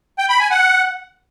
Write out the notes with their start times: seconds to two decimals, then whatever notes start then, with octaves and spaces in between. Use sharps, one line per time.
0.18 G5
0.29 B5
0.40 G#5
0.51 F#5